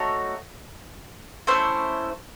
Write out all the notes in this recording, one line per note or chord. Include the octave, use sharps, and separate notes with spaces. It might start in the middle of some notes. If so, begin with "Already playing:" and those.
Already playing: A3 D#4 F#4 C#5
A3 C#4 E4 C5